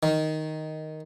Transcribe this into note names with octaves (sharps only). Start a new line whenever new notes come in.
D#3